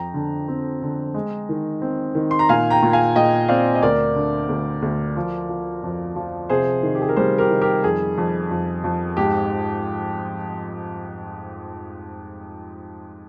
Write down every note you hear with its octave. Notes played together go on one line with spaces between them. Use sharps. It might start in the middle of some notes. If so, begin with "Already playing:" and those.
Already playing: F2 G5 A#5
D3
C4
D3
G#3
D#3
C4
D#3
C6
A#5
A#2 F5 G#5
G5 A#5
A#2
F5 G#5
A#2 D#5 G5
C4 D5 F5
D#5
D2 A#4 D5
D3
D2
D2
F3
F3
F2
F3
C3 G#4 C5
D#3
G4
G#4
A#4
G3 G#4 C5
G4 A#4
D#3
G4 A#4
F2 G#4
F2
F2
F2
G#2 G4